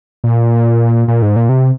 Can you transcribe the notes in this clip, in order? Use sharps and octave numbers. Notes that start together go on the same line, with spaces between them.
A#2
A#2
G#2
A#2
C3